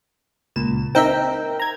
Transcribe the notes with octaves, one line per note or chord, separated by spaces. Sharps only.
C#2 A#2 E7
C4 D#4 A#4 E5 G5
A#5 G#6